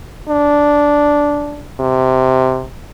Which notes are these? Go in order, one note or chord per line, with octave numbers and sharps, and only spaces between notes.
D4
C3